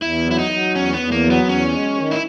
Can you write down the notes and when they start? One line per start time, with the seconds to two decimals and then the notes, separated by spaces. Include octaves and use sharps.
0.02 E2 E4
0.26 F#3
0.31 E4
0.39 D#4
0.51 F#3
0.75 E2 C#4
0.93 B3
1.00 E2
1.12 A#3
1.24 F#3
1.31 B3
1.48 E2 C#4
1.73 G#3
1.97 D#3
2.11 E4